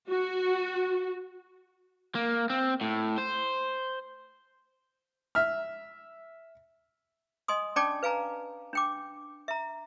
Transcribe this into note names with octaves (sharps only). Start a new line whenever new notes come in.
F#4
A#3
C4
A2
C5
E5 F6
D#5 G#5 C6 D#6
C#4 D4 D5 G5 A5 D6
B4 F5 G#5 A#5
D4 G5 D6
E5 A#5